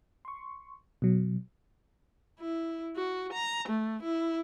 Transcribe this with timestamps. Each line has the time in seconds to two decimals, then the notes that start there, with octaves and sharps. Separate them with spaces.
0.25 C6 C#6
1.02 B2 F#3
2.40 E4
2.96 F#4
3.33 A#5
3.68 A3
4.03 E4